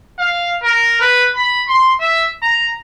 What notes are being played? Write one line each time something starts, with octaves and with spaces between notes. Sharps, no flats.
F5
A#4
B4
B5
C6
E5
A#5